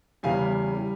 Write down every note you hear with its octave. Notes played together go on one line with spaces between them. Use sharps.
E2 C#3 E3 G3 F5 G#5
G3